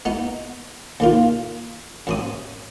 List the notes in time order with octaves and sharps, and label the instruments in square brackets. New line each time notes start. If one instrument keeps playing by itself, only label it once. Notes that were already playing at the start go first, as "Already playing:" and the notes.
[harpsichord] B3 D#4
D#2 A#3 F4
F#2 C4 D#6